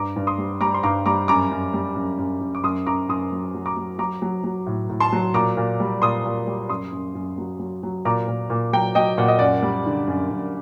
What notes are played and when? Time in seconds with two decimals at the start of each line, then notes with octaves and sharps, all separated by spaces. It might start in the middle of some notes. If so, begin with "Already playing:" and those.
Already playing: G2 A#5 D6
0.16 G2
0.27 C6 D#6
0.38 G3
0.61 G3 A#5 D6
0.74 C6
0.83 G2 A#5 D6
1.06 G3 A#5 D6
1.28 F#2 A#5 D6
1.51 F#2
1.74 G3
1.97 F#2
2.19 F#2
2.41 F#2
2.55 D6
2.64 F#2 C6 D#6
2.87 F#2 A#5 D6
3.09 F#2 C6 D#6
3.32 F#3
3.55 F#3
3.66 A#5 D6
3.77 F#3
3.99 F#3 A#5 D6
4.22 F#3
4.44 F#3
4.67 A2
4.90 A2
5.00 A5 C6
5.13 F#3
5.34 A#2 A#5 D6
5.57 A#2
5.80 G3
6.02 A#2 C6 D#6
6.25 A#2
6.47 G3
6.69 F#2 C6 D#6
6.92 F#2
7.15 F#2
7.38 F#3
7.60 F#3
7.83 F#3
8.05 A#2 A#5 D6
8.28 A#2
8.50 A#2
8.73 F#3 G5 A#5
8.95 F#3 D#5 G5
9.18 A#2 F#5
9.28 D#5
9.39 F#2 D5 F#5
9.63 G3
9.86 D3
10.08 F#2
10.31 F#2